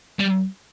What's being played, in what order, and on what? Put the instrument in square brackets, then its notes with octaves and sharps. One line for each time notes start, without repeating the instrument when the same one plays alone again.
[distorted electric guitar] G3